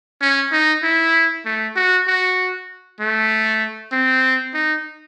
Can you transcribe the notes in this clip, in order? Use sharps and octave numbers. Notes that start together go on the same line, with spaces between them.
C#4
D#4
E4
A3
F#4
F#4
A3
C4
D#4